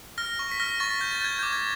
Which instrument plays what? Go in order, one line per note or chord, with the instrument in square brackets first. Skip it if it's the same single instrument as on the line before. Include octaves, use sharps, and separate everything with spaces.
[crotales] F6 A#6
C#6
B6
F6 A#6
C#6 A6
G6
A6
G6 G#6
D6 G6
G#6